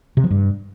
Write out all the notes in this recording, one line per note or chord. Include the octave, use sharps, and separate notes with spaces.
C3
F3
G2